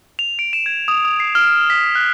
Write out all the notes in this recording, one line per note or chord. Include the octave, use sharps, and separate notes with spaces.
F7
D7
E7
G#6
D#6
D#6
C7
F6
B6
F#6